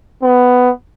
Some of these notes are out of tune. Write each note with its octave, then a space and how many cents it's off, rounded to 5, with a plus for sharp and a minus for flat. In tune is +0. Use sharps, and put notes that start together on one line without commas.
B3 +10